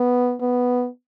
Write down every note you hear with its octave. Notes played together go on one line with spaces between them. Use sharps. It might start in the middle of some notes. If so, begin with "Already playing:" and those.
Already playing: B3
B3